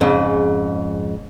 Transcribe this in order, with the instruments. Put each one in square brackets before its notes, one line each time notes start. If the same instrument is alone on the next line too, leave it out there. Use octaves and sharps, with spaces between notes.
[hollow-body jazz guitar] F2 G#2 C#3